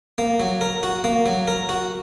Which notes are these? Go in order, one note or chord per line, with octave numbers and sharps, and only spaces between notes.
A#3
F#3
A#4
F#4
A#3
F#3
A#4
F#4